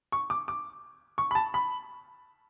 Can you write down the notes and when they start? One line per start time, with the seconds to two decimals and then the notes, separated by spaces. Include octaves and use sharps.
0.12 C#6
0.30 D6
0.48 D6
1.18 C#6
1.31 B5
1.35 A5
1.54 B5